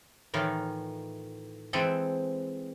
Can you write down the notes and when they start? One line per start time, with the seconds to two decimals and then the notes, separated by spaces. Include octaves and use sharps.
0.34 A2 D#3 E3 F4
1.73 E3 G#3 C4 A4